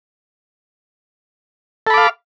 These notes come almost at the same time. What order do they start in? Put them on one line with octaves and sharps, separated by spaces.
A4 B5 D6 F5